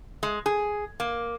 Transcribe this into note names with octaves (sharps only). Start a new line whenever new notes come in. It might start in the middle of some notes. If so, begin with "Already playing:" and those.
G#3
G#4
A#3